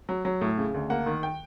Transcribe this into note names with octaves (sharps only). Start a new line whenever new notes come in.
F#3
F#3
A2
C#3
D2
A#3 F#5
D#3
G5